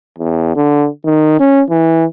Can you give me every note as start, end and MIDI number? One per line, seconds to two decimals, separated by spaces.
0.18 0.53 40
0.56 0.88 50
1.05 1.37 51
1.40 1.62 61
1.70 2.05 52